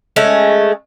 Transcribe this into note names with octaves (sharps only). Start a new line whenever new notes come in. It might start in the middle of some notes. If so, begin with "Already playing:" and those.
G#3 A3 C#4